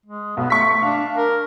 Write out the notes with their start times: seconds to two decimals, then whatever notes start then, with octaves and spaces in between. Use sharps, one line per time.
0.06 G#3
0.37 B1 B3
0.50 A3 C#6 B6
0.82 D4 F5
1.17 A#4